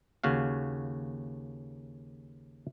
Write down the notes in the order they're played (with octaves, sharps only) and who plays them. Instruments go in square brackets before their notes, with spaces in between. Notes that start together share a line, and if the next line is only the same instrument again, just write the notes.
[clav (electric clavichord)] D#2 C#3 F#4 F5